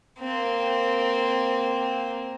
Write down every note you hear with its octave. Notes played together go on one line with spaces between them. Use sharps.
A#3 C4